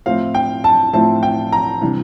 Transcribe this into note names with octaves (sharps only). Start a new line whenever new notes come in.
A2 F3 C4 E4 F5
G5
A5
A2 F3 C4 E4 A5
G5
A#5
C3 E3 G3 D4